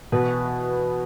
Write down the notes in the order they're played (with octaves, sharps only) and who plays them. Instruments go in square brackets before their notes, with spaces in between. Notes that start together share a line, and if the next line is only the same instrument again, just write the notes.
[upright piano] B2 [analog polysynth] E3 B3 F#4 B4